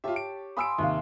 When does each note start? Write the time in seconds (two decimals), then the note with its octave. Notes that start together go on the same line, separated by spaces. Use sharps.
0.04 F4 G4 C#5 E5 A5
0.16 D7
0.57 G#5 B5 C6 D#6 E6 D7
0.79 D#2 C3 E5 F5